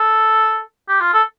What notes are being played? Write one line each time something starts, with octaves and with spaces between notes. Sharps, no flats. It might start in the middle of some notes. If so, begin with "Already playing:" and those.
Already playing: A4
G4
F4
A4